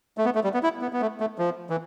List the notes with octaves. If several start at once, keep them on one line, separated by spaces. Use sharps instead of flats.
A3
B3
A3
G3
B3
E4
B3
B3
A3
A3
F3
E3